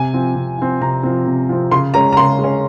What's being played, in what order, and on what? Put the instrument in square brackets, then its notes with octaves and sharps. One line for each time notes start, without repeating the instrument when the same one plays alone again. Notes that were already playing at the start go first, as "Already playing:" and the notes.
Already playing: [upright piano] C3 G#5
F3 C4
C3
F3 C4
C3 A#5
F3 C4
C3
F3 C4
C#3 C6
G#3 C#4 A#5
A#5
C#3 C6
G#3
C#4